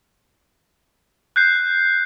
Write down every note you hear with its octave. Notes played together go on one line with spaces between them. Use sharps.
F#6 G6 C7